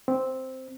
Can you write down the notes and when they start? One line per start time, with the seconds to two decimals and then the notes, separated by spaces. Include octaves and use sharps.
0.08 C4